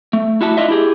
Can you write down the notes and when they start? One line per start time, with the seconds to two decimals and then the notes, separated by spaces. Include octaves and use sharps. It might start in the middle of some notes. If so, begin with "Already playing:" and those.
0.13 A3
0.41 E4 F#4 E5 A5
0.57 D4 E4 F4 D#5 E5
0.68 E4 G4 G#4